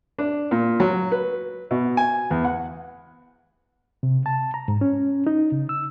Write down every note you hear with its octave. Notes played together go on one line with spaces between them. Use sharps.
D4
A#2
F#3
B4
B2
G#5
E2
F#5
C3
A5
A#5
G#2
C#4
D#4
C#3
E6